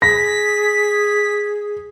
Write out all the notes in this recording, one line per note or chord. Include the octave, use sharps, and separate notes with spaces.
G#4 A#6 B6